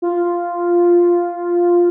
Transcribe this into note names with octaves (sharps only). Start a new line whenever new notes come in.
F4